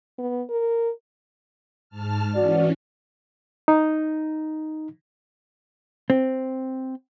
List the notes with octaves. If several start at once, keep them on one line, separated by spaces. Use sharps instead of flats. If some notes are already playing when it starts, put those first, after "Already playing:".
B3
A#4
G#2 A5 F6
E3 C#4 F#4 D5
D#4
C4